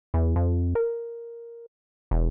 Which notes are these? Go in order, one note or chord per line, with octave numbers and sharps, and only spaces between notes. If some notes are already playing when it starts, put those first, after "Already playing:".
E2
F2
A#4
E1